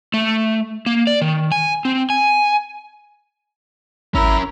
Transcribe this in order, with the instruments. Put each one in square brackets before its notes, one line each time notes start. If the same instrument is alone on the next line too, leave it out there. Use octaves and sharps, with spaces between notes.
[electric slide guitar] A3
A#3
D5
D#3
G#5
C4
G#5
[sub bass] G#1 [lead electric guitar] C#4 A#4 [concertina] E4 A#5